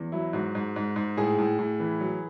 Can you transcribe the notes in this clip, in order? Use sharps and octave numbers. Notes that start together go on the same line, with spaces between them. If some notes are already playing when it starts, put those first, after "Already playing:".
Already playing: E2
F#3 E4
G#2 F#4
G#2
G#2
G#2
A2 G#4
A2
A2
E3
F#3